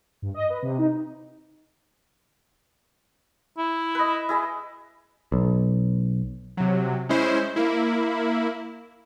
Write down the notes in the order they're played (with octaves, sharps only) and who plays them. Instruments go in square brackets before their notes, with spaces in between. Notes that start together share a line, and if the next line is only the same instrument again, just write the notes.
[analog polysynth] G2
D#5
B4
C3
D#4
[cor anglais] E4
[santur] B4 D#5
E4 G#4 D#5
[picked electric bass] B1
[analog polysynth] C3 F#3
G#3 C#4 E4 C5
A#3 E4